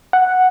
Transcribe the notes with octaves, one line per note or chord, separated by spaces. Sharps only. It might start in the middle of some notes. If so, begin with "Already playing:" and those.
F#5